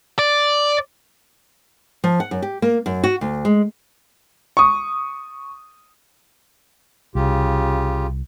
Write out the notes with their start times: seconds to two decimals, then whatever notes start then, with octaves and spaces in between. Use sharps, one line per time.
0.19 D5
2.04 F3
2.20 F#5
2.31 F#2
2.42 G4
2.62 A#3
2.86 F#2
3.04 F#4
3.21 D2
3.45 G#3
4.57 C#6 D#6
7.15 C2 C#3 F4 G4